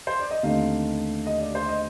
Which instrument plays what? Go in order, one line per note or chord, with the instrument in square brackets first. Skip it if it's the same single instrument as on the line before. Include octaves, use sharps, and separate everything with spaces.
[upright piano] C5
D5
D#5
D#2 D3 A3 C4 D#4 F5
D#5
D5
C5
D#5